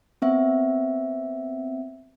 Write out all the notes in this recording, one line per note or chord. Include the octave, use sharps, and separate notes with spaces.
B3 C4 E5